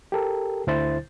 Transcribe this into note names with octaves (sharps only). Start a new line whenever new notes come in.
G4 A4 A#4
D2 D3 E4 C5 A6